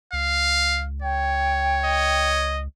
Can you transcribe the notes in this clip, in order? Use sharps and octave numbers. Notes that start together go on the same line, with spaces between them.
C#2 F5
C#5 G5
D#5